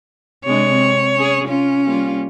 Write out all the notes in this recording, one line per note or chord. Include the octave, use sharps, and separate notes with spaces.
C3 G#3 D4 C#5
C4
C#4 G#4
C#4 F4
G3 A#3 F4